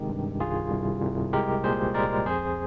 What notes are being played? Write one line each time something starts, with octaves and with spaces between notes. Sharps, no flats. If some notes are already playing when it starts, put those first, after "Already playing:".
Already playing: C3 D#3 G#3 G4
G2
C2 F4 G#4
C2
C2
G#3 G4 A#4
A#2 G#4 C5
G#3 A#4 D5
F2 G#4 C5